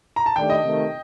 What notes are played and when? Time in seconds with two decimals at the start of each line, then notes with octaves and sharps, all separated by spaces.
0.16 A#5
0.26 A5
0.35 D#3 A3 D4 G4 G5
0.50 D#5
0.63 C3 D#3 A3